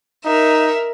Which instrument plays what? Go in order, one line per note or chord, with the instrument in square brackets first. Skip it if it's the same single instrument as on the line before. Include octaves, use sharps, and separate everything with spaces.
[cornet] D#4 [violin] A#4 E5